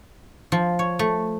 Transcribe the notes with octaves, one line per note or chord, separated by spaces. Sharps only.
F3
C#5
A3